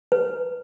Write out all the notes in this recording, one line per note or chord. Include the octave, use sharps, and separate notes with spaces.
B4